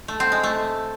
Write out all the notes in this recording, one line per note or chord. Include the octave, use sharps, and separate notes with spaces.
A3
C4
G#3
A3